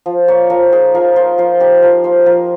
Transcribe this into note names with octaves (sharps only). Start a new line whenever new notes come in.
F3
A#3 C#5
F3 A#4
D#4 G#4
F3 A#4
A#3 C5
F3 C5
D#4 G4
F3 A#4
A#3 C5
F3 A#4